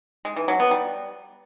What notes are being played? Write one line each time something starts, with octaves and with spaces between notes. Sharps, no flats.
G#3
E3
F#3
B3
G3